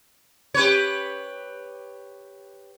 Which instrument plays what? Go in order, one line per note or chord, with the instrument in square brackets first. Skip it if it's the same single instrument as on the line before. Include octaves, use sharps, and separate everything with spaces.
[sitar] G4 B4 C#5